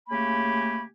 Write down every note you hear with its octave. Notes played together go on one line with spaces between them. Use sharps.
C#3 A3 A#3 G4 G#5 B5